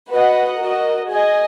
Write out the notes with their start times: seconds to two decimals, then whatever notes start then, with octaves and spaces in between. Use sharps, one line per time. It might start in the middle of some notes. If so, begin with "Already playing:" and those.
0.10 F#4 B4 D#5 F#5
0.60 F#4 A#4 D#5
1.10 G#4 D#5 G#5